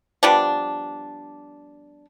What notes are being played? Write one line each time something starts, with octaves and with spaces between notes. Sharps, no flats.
F3 G3 B3 D4